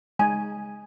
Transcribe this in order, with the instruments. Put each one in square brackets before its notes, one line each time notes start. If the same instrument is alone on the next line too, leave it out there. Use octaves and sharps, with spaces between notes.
[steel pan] G#3 D#4 G#5